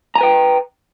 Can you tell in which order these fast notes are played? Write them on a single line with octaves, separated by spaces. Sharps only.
A#5 G#5 B4 G5